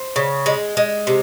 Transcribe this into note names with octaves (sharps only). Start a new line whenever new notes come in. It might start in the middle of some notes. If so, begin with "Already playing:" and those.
Already playing: C5
C#3
G#3
G#3
C3